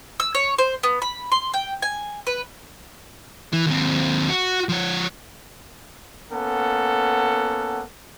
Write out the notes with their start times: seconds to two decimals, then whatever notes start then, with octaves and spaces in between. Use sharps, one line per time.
0.20 E6
0.35 C#5
0.58 C5
0.83 B3
1.02 B5
1.32 C6
1.54 G5
1.82 G#5
2.27 B4
3.53 E3
3.66 D#2 C4
4.29 F#4
4.69 F3 C#5
6.31 A#3 B3 C#4 A4 F#5